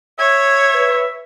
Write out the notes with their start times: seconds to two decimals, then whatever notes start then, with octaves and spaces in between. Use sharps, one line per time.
0.19 C#5 E5 G#6
0.74 B4